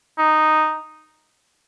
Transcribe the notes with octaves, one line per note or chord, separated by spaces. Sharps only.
D#4